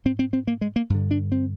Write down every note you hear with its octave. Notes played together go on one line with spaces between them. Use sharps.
G#2 C4
C4
C4
A#3
G#3
A#3
G2 D3
D4
C4